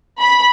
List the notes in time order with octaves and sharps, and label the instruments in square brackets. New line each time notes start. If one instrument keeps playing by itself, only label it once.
[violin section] B5